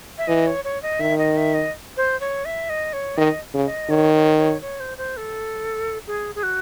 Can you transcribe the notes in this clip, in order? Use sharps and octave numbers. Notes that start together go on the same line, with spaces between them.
E5
E3 D#5
C#5
C#5
D#5
D#3 E5
D#5
E5
D#5
C5
C#5
E5
D#5
C#5
D#3 D#5
C#3
D#5
D#3 C#5
C#5
C#5
C#5
C5
C5
A4
G#4
G#4
F#4